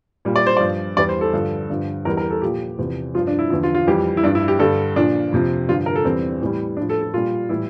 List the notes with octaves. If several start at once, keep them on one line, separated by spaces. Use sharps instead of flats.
A#2 G3
D5
C5
G2 F3 D5
E2 E3 G3 D5
C5
A4
G2 D3 F3
G2 D3 F3
E2 E3 G3 A#4
A#4
A4
A#2 F3 G4
E2 C3 F3
G2 F3 F4
D4
E4
E2 D3 F3 E4
F4
F4
F2 E3 G3 G4
E4
G2 F3 D4
E4
G4
G2 D3 G3 A4
A#2 F3 D4
F2 C3 F3
G2 D3 F3 F4
A#4
A4
E2 E3 G3 C4
A2 E3 G3
A2 F3 D4
A4
A4
A#2 G3 F4
A2 E3 G3 E4